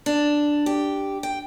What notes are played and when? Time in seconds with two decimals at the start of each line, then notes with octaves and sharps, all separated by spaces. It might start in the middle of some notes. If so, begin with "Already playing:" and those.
0.06 D4
0.66 G4
1.23 G5